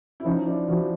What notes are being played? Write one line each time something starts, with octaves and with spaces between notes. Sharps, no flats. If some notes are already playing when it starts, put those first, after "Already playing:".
E4
F3 C#4 D#4
D4 E4
F3 E4 F#4
F#4